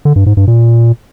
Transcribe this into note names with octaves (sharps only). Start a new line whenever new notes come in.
D3
G2
G#2
G2
A#2